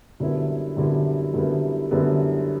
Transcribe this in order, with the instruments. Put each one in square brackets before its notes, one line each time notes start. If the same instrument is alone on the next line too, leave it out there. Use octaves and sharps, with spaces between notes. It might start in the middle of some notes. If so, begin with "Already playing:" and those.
[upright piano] F#2 D3 G3 B3 E4
F#2 D3 G3 B3 E4
F#2 D3 G3 B3 E4
F#2 D3 G3 B3 E4